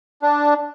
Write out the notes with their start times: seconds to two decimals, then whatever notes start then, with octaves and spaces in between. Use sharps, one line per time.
0.22 D4